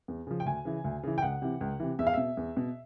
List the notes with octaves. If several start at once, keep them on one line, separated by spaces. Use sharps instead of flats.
E2
C#3 F3
G5
D2 G#5
C#3 E3
D2
C#3 E3
G5
C#2 F#5
C3 E3
C#2
C3 E3
E2 E5
F5
B2 E5
E2
B2